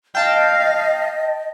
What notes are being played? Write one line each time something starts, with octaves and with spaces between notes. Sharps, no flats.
D#5 F5 G5 A5